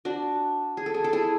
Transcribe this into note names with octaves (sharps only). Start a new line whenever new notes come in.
D4 F#4
G#4
A4
G#4
A4
E4 G#4